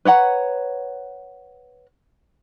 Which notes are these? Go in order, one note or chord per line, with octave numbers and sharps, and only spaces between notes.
B4 C#5 F#5 A#5